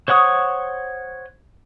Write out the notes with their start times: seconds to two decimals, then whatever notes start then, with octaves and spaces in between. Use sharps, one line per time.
0.08 C5 C#5 F#5 C#6 D#6